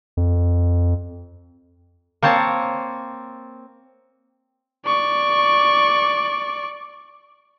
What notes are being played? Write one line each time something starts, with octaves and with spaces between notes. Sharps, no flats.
F2
A#3 C4 C#5 A5
D5 C#6